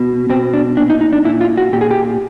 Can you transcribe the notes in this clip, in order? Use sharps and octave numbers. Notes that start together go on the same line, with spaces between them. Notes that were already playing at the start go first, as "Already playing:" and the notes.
Already playing: B2
B2 C4
D4
A#2 D4
D#4
D#4
D4
A#2 E4
F4
F#4
A#2 G4
G#4
G4